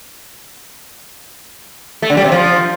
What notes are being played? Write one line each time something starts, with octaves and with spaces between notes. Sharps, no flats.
A3
D3
G3
C3
F3